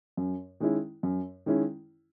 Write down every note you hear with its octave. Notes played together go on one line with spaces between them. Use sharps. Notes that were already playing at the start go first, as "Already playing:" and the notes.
F#2
D#3 G#3 C#4 E4
F#2
D#3 G#3 C#4 E4